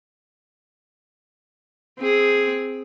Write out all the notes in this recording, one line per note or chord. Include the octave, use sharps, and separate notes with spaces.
C4 G#4